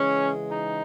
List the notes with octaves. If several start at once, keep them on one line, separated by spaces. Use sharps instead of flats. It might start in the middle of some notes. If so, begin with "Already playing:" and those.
Already playing: C#3 E3 G#3 C#4
D#4